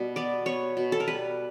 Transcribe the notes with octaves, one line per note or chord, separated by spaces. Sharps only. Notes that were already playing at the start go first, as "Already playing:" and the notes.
Already playing: B2 G3
B3 D5
B3 C#5
B2
A4
A#4
G3 B4